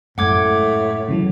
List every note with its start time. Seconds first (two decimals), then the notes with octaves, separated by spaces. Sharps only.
0.18 F#2 A2 G#3 F#5 D6 G#6
1.09 C#3 E3 F#3